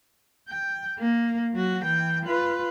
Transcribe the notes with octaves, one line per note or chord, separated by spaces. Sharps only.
G5
A#3
F#3 F#4
E3 G5
F4 B4